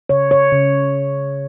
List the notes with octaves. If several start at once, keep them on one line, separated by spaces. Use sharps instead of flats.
C#3 C#5
C#5
C#3